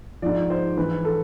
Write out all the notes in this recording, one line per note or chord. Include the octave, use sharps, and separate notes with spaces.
G#2 F3 D5
C5
G#2 E3 B4
A4